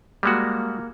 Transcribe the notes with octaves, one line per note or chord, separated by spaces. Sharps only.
G3 G#3 A#3 F#4